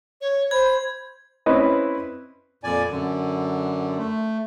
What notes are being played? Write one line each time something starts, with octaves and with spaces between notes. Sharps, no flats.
C#5
C5 B5 G#6
C4 C#4 E4 B4 D#5
F2 A#2 D5 G#5
F#2 D3
A3